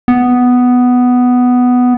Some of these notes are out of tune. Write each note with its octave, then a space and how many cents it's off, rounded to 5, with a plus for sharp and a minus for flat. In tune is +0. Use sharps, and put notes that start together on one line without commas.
B3 +5